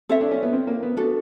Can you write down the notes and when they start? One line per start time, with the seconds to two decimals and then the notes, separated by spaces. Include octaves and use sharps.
0.09 C4 A4 C#5 E5
0.21 D4
0.31 C#4
0.43 B3
0.53 C4
0.67 A#3
0.83 B3
0.97 B3 D4 F#4 A4